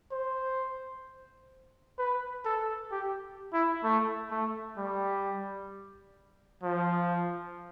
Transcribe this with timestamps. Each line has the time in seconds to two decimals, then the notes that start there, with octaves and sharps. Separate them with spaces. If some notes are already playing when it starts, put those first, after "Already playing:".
0.12 C5
1.98 B4
2.45 A4
2.91 G4
3.53 E4
3.84 A3
4.31 A3
4.78 G3
6.63 F3